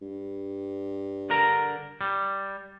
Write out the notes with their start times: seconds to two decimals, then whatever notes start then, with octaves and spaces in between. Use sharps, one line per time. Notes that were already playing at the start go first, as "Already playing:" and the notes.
0.01 G2
1.30 D3 A#4 A#5
2.01 G3